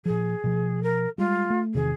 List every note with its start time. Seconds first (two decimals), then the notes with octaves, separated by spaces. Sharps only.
0.06 A#2 F3 G#4
0.44 B2 F3
0.83 A#4
1.18 G3 G#3 F4
1.50 A3
1.74 E2 C3 D#3 G#4